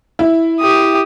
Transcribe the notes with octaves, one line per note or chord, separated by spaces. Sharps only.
E4
G4 D#6